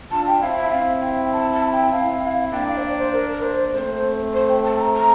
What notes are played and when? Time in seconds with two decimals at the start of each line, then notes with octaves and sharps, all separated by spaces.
0.11 D4 F4 A5
0.27 G5
0.41 C4 E4 F5
0.57 E5
0.71 C4 E4 F5
1.01 G5
1.32 A5
1.52 A5
1.72 G5
1.92 C4 E4 F5
2.52 A#3 D4 G5
2.68 F5
2.76 C5
2.83 D5
2.98 C5
3.13 A#4
3.32 A#4
3.43 C5
3.74 A3 C4 C5
4.34 C5
4.49 G5
4.64 A5
4.79 A#5
4.95 A#5